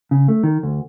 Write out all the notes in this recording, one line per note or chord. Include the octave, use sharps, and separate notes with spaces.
C#3
A3
D#3
D2